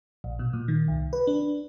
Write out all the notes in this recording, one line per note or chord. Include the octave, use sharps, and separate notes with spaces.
A#1
B2
A#2
D#3
C2
B4
D4